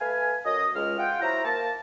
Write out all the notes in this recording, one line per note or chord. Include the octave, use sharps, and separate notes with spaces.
A3 B4 F5 G#5
F#2 D#5
C#2 G#3 F6
F4 F#5 G5
F#3 E4 C5 A#5
A#3 A5